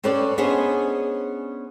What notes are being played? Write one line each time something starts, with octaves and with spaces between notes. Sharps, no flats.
C4 C#4 A4 B4 C#5 D5
B3 C#4 D4 G#4 C5 D#5